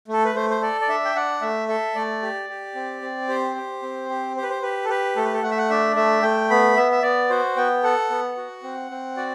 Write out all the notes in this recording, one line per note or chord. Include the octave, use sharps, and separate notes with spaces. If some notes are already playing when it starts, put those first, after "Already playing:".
A3 A4
B4
A3 C5
C5
A4 D5
D5
D4 E5
G5
D4 F#5
A3 E5
A4 E5
A3 D5
G4
G4
C4
C4
G4 C5
G4
C4
G4
G4 C5
B4
C5
G4 B4
A4
G4 B4
A3 A4
B4
A4
A3 F#5
E5
F#5
D4 E5
A3 E5
A3 G5
B3 B5
B3 E5
E5
B3 D5
F#4 C5
B3 G5
A4 F#5
B3
F#4
C4
C4
F#4 D5